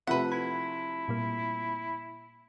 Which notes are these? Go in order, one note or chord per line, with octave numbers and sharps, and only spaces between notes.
C3 F3 A3 B4 E5 F#5
E4 B5 G#6
A#2 G3 A#3